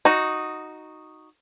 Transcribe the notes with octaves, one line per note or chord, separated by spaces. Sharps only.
D#4 F#4